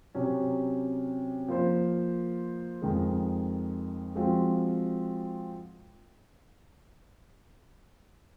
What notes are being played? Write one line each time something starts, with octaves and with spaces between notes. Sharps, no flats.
C3 F#3 C#4
F3 A#3 F4 C5
F2 D#3 G#3
F3 G#3 C4 F#4